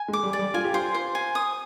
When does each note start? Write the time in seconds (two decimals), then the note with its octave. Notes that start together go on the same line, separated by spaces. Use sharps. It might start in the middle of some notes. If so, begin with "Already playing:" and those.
Already playing: G#5
0.08 G#3
0.13 D6
0.23 G3
0.33 D5
0.39 G3
0.54 F4 G#5
0.64 G4
0.74 F4 C5
0.94 C5
1.15 G#5
1.35 D#6